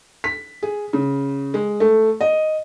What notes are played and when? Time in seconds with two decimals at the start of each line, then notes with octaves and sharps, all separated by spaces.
0.24 B6
0.63 G#4
0.93 C#3
1.54 G#3
1.80 A3
2.21 D#5